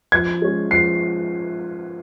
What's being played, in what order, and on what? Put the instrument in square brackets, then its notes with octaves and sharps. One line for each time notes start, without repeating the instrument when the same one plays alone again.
[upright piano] F3 [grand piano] G#6
[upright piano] G#3 C#4
[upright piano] F3 [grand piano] C7